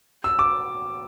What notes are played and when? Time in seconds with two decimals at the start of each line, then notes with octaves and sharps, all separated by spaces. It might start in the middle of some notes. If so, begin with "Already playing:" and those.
0.24 E6
0.39 D6